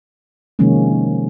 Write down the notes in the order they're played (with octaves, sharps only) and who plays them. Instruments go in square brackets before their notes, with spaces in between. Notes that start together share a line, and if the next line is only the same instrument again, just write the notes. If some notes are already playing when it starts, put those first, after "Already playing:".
[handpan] C3 D#3 F3 G#3 A#3 C#4